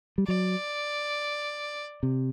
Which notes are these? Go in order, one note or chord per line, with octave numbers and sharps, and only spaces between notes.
G3
F#3 D5
C3